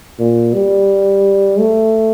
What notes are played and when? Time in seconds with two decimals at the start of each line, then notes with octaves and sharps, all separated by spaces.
0.19 A#2
0.54 G3
1.60 A3